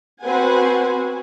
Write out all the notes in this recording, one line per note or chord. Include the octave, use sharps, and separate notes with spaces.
C4 F#4 B4 C5 F#5 G#5